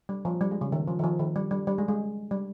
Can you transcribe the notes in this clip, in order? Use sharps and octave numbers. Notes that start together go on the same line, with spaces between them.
G3
F3
G3
G#3
C#3
D#3
F3
D#3
F3
D#3
G3
G3
G3
G#3
G#3
G3